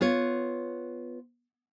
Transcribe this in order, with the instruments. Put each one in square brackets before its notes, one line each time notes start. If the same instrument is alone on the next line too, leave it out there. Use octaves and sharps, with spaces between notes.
[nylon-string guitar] B3 F4 C#5